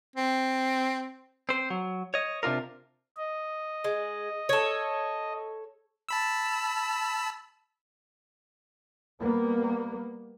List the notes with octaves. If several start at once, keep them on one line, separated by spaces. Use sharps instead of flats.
C4
C4 C5
F#3
C#5 D#5
C3 D4 F4 A#4
D#5
G#3
A4 C#5
A5 B5 E6
G3 A#3 B3